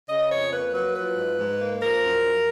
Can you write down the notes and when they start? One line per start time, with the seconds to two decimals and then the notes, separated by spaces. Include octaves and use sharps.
0.09 C#3 D#5
0.30 F2 C#5
0.52 A#3 B4
0.73 F#3 B4
0.95 F3 B4
1.17 G#2
1.38 G#2
1.60 A#3
1.81 F3 A#4
2.03 F#2
2.25 F#2